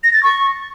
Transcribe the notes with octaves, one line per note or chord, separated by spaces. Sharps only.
A#6
A6
C#6